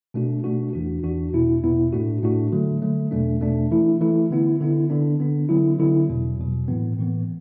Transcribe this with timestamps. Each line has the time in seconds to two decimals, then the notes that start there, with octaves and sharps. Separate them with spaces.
0.14 B2 A3 D4 F#4
0.44 B2 A3 D4 F#4
0.73 E2 E3 D4 F#4
1.03 E2 E3 D4 F#4
1.33 E2 B2 B3 E4
1.63 E2 B2 B3 E4
1.93 A2 A3 D4 F#4
2.23 A2 A3 D4 F#4
2.52 D3 F#3 A3
2.82 D3 F#3 A3
3.11 E2 B2 A3 D4
3.41 E2 B2 A3 D4
3.71 E3 A3 E4
4.01 E3 A3 E4
4.31 D3 B3 E4
4.61 D3 B3 E4
4.90 D3 B3 D4
5.20 D3 B3 D4
5.49 D3 F#3 B3 E4
5.79 D3 F#3 B3 E4
6.09 E2 B2 F#3
6.38 E2 B2 F#3
6.68 A2 E3 B3
6.98 A2 E3 B3